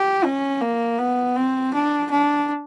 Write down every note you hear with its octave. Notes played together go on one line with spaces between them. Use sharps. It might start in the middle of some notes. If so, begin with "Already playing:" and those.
Already playing: G4
C#4
A#3
B3
C4
D4
D4